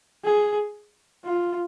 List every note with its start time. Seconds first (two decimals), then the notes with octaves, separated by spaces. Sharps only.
0.25 G#4
1.25 F4